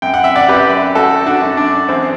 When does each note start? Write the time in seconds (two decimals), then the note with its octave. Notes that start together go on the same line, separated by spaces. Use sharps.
0.02 F#2 G5
0.14 F#5
0.24 E5
0.35 D5 F#5
0.49 F#2 G4 B4
0.95 A3 F#4 A4
1.26 D4 F#4
1.41 F#2
1.57 D4
1.88 E2 C4